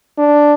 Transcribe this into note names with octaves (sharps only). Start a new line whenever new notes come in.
D4